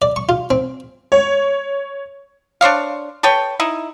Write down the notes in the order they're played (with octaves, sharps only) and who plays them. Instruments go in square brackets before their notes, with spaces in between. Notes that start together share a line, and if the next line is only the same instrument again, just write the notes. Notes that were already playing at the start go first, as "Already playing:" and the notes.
[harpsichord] D5
C#6
F4
C4
[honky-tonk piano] C#5
[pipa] D4 C5 C#5 F5
A4 B4 C#5 G5
D#4 E4